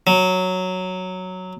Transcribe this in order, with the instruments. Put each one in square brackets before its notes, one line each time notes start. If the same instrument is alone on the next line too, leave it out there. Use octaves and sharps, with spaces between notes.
[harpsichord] F#3